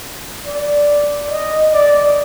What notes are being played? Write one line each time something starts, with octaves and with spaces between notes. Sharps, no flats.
D5
D#5
D5